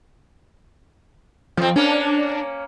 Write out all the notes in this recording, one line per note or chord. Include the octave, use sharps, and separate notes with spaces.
F2 F3 C4
A#3 C#4 D4